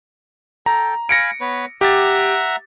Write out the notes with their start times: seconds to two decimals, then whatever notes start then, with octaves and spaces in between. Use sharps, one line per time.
0.66 A4 G5 A#5
1.09 F5 G#5 B5 A#6 C#7 D7
1.41 B3 B4 C#5
1.81 G4 E5 F#5 A#5 A6